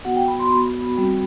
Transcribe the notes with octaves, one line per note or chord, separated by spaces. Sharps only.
B3 F#4 F#5
G5
B5
C6
B3 F#4 B5
G3 C4 F#4